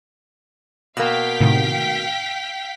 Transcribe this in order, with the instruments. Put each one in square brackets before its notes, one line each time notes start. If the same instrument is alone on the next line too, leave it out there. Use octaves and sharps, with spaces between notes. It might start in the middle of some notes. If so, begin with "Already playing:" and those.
[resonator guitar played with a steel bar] B2 A#3 [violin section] F5 G5 B6 [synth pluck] E6
[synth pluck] A2 C3 D#3